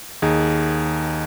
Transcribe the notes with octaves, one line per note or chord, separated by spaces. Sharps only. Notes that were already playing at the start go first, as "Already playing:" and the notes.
D#2 D#4 G#4